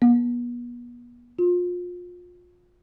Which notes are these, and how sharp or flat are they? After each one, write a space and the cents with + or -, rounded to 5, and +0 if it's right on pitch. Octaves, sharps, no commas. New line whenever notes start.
B3 -35
F4 +30